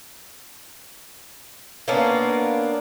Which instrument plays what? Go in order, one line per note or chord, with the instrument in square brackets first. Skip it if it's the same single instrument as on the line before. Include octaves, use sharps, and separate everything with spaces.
[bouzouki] A#3 B3 C#4 D4